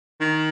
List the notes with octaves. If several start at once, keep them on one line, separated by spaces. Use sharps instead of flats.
D#3